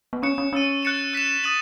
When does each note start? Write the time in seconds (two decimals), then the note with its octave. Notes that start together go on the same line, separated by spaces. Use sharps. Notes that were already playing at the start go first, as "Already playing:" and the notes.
0.13 B3
0.22 C#4 C#6 F#6 C#7 E7
0.38 C#4
0.53 C#4 E6 A6 D#7
0.83 F#6 A6 C#7 E7
1.13 F#6 B6 E7
1.43 D#6 A6 D#7 F#7